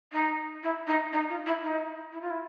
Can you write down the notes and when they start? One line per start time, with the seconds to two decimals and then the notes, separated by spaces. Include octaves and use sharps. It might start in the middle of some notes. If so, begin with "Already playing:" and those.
0.13 D#4
0.63 E4
0.87 D#4
1.12 D#4
1.29 F4
1.46 E4
1.62 D#4
2.12 E4
2.21 F4
2.30 E4